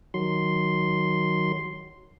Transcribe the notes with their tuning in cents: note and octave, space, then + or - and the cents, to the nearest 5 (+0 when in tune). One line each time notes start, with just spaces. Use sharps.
D#3 +0 F#3 +0 C6 +0